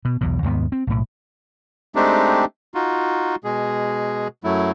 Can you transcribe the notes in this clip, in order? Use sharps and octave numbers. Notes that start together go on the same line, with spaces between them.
B2
B1 E2 B2
D#2 G#2 D#3 B3
C4
B1 A2
G#3 A3 C4 D4 D#4 G4
D#4 F4 F#4
B2 G#3 G#4
F#2 F#3 A3 E4